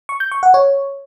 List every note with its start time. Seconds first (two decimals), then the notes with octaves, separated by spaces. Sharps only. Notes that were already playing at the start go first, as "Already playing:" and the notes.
0.09 C#6
0.20 G6
0.32 C#6
0.43 F#5
0.54 C#5